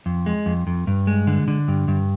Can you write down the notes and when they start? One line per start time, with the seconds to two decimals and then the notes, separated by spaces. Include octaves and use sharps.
0.06 F2
0.26 G#3
0.46 F2
0.67 F2
0.87 G2
1.07 G#3
1.27 D3
1.48 D3
1.68 G2
1.88 G2